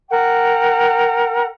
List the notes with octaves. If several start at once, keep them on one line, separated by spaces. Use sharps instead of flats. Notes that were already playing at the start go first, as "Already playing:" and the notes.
A#4 F#5 G5